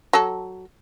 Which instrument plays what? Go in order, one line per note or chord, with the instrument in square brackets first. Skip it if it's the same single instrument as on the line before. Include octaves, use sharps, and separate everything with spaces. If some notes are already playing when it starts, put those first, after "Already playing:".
[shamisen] F#3 A4